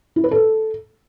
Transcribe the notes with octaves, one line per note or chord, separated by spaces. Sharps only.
E4
B4
A4